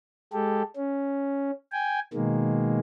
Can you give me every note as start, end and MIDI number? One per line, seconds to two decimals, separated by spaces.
0.33 0.62 56
0.33 0.62 67
0.33 0.62 69
0.76 1.51 61
1.72 2.00 79
1.72 2.00 80
2.14 2.79 47
2.14 2.79 51
2.14 2.79 56
2.14 2.79 58